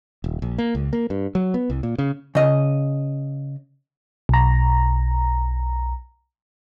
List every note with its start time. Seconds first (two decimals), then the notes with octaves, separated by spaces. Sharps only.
0.24 D#1
0.42 A#1
0.58 A#3
0.75 C#2
0.93 A#3
1.10 G2
1.35 F#3
1.54 B3
1.70 C2
1.83 A#2
1.98 C#3
2.35 C#3 D#5
4.29 B1 A#5